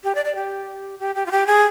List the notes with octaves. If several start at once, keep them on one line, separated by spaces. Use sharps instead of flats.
G4
D5
D5
G4
G4
G4
F4
G4
G#4